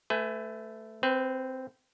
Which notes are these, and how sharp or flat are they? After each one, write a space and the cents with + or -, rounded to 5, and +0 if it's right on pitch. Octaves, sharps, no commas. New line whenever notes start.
A3 +0 B4 +30 G#5 +0
C4 -5 B4 +25